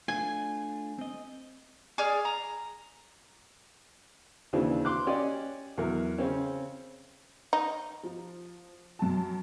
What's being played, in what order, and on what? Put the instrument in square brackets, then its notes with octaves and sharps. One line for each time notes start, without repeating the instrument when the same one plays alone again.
[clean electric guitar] A3 D4 F4 [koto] G#5
[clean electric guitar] C4 D#5
[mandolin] G#4 D5 F6
A#5
[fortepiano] D#2 C#3 E3 C4 D4
C6 D6 F#6
C#4 G4 D5 D#5
E2 F#3 A#4
C#3 C4 C#4
[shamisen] D#4
[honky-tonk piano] F3
F#2 A5